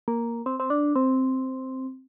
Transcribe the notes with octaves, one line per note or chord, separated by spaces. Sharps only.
A#3
C4
C4
D4
C4